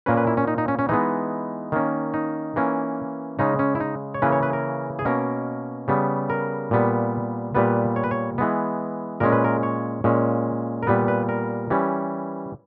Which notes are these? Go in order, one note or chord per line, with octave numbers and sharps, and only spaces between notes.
A#2 A#3 C#4 B4
B4
E4
C#4
D#4
D#4
C#4
C#4
E3 G#3 B3 D#4
D#3 A#3 C#4
D#4
E3 A#3 C#4
C#3 G#3 C#4 D#4
C#4
E4
D#4
C#5
C#3 E3 A#3 C#4 B4
C#5
B4
A#4
G#4
B2 A#3 C#4 A#4
C#3 G3 B3
A#4
A#2 G3 B3
A#2 G3 B3 B4
C#5
B4
C#5
E3 G#3 B3
A#2 G#3 C#4 A#4
B4
A#4
C#5
A#2 G#3 C#4
A#4
A#2 G3 B3 B4
B4
A#4
E3 G3 C#4